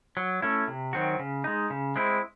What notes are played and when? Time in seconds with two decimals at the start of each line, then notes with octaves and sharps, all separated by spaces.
0.17 F#3
0.42 A3 C#4 E4
0.68 C3
0.93 D#3 F#3 C4 F#4
1.19 C#3
1.44 G#3 D#4
1.70 C#3
1.96 G#3 C4 E4